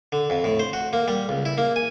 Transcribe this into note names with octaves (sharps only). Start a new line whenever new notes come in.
D3
F2
A2
C5
F#4
A#3
G3
C#2
E4
A#3
G#5